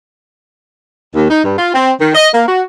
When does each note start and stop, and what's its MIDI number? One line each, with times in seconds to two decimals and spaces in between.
1.15 1.25 39
1.30 1.44 63
1.44 1.54 43
1.58 1.74 65
1.74 1.91 60
2.00 2.12 51
2.15 2.29 75
2.34 2.46 58
2.47 2.61 66